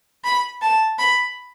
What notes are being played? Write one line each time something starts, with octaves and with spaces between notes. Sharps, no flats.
B5
A5
B5